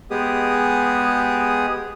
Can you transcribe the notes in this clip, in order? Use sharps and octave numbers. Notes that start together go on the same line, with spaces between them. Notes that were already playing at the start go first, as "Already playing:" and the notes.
G#3 B3 G4 G#4 D#6